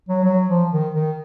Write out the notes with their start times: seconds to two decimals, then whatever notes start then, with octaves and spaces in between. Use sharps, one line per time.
0.08 F#3
0.24 F#3
0.48 F3
0.71 D#3
0.94 D#3